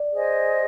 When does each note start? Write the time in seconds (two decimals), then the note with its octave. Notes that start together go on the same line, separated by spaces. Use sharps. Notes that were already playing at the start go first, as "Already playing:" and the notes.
Already playing: D5
0.12 G#4 C5 D#5 G#5